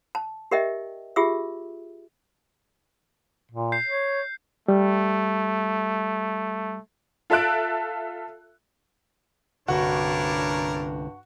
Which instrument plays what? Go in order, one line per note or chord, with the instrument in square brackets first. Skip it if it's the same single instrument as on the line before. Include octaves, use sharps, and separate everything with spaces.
[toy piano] A5
G4 A#4 D#5 E5 G5
F4 G4 G#4 E5 E6
[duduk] A#2
[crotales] G6 C7
[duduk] C#5
[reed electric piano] G3 [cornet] A3
[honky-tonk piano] F4 A4 E5 A5 F#6 D7
[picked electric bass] C2 D3 [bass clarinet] G2 [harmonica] D4 A#4 C#5 [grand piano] F#4